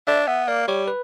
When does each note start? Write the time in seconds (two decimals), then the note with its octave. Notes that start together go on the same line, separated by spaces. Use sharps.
0.07 D4 E5
0.27 B3 E5
0.48 A#3 D5
0.68 G3 C#5
0.88 B4